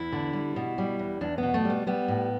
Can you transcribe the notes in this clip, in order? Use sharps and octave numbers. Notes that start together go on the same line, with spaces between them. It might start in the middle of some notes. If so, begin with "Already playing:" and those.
Already playing: E2 E4
D3
G3
B2
G3
E2
E2 D4
B3
B2
A3
G3 B3
G3 B3
A2